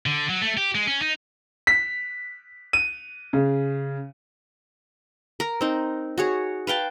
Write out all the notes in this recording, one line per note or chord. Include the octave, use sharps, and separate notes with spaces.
D3
F#3
A3
G4
G#3
C#4
D#4
B6
D#7
C#3
A#4
C4 D#4
F#4 G#4 C#5
B4 F5 G5 A5